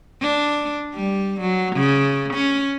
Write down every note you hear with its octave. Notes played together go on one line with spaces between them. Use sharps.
D4
G3
F#3
C#3
C#4